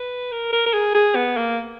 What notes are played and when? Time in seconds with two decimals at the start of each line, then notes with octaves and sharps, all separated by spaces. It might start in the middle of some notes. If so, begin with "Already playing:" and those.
Already playing: B4
0.32 A#4
0.53 A#4
0.66 A#4
0.73 G#4
0.94 G#4
1.16 B3
1.37 A#3